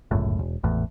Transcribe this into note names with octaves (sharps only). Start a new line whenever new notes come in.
G1 C#2 F#2 A2
E1
G#1 E2 A2